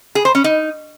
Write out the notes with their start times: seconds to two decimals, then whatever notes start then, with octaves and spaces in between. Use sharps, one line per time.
0.15 G#4
0.25 C5
0.35 C#4
0.44 D#4